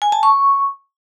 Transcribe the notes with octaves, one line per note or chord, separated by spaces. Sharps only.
G#5
A5
C#6